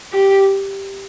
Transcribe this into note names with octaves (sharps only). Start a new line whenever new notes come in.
G4